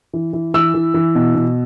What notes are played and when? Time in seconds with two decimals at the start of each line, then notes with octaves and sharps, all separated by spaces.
0.13 E3
0.33 E3
0.54 E3 E6
0.74 E3
0.94 E3
1.15 B2
1.35 B2